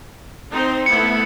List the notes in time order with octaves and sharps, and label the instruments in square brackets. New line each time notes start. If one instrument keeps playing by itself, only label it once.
[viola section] C4 D#4 C5
[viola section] A3 B3 E4 [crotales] C#7